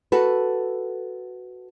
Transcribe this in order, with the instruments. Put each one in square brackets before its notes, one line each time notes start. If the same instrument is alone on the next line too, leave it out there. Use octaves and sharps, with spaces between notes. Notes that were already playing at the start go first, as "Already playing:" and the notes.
[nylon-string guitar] F#4 A4 B4